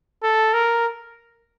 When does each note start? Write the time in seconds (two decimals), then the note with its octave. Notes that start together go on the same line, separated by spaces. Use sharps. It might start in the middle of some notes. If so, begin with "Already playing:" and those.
0.24 A4
0.54 A#4